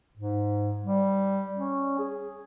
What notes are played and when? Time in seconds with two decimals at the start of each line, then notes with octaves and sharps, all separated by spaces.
0.18 G#2
0.84 G3
1.56 C#4
1.99 G#4